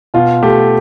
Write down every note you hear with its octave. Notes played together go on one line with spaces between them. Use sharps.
B2 F4
A3 G4